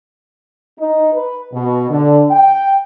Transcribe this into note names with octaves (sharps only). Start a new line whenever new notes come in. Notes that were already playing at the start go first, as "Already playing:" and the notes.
D#4
B4
B2
D3
G5